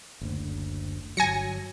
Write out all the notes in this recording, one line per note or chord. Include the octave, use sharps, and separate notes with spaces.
F#1 D2
G1 C2 F#3 G#5 A#6 C#7